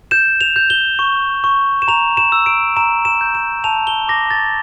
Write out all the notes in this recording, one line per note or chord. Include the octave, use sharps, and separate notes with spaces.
G6 E7
F7
G6
G7
C#6
C#6
E7
A#5 F7
E7
E6
D7
A#5 E7
E7
G6
E7
A5 F7
G7
D6 A#6
A6